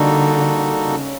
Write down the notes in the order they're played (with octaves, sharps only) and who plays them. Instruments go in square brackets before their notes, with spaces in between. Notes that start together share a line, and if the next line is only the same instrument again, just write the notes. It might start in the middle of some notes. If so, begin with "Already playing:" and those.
Already playing: [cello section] D3 [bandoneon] G3 A#3 D#4 F#4 A4
[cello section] C#3